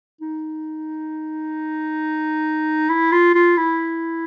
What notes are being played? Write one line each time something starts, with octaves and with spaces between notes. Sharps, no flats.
D#4
E4
F4
F4
E4